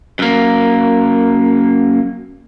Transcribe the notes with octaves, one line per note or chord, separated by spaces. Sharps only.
F#2 A#3